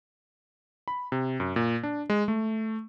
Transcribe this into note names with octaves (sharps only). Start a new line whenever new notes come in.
B5
C3
F#2
A#2
D4
G#3
A3